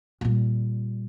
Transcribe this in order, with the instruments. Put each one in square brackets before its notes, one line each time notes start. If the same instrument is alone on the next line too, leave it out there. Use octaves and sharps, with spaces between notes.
[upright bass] A#2 G3